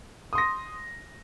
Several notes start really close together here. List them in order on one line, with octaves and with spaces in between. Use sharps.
D#6 C6 A#6